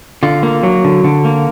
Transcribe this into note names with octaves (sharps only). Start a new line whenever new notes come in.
D3 F4
A#3
F#3
D3
D3
A#3